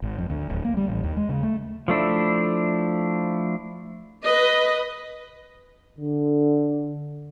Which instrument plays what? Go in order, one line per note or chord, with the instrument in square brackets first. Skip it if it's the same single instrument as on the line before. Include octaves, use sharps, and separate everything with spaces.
[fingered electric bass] G#1
F2
D2
D1
A#3
G3
A1
D#2
G#3
C#3
A3
[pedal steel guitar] F3 A3 D4 E4
[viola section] B4 D#5
[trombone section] D3